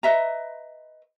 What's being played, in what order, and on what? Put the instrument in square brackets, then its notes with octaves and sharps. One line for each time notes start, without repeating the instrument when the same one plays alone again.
[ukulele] B4 D#5 E5 A#5